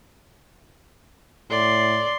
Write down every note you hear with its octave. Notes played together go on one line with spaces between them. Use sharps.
A2 D5 C6